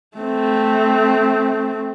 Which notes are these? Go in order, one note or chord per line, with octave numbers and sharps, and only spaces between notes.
A3 C4